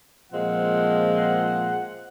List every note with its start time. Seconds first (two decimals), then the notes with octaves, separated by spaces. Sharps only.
0.32 A#2 F3 G#3 C4 F#5
1.17 F#5